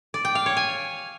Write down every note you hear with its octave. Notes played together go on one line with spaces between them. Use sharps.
D5
G5
F5
C#5
G#5